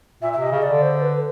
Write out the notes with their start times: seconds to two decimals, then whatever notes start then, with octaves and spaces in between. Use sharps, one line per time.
0.22 A#2 E5
0.33 E5
0.38 C3 D#5
0.51 C#3
0.62 D3 D5
0.82 C5
1.02 B4